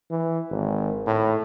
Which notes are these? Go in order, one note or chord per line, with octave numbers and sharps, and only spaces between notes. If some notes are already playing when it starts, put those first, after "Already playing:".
E3
G#1
A2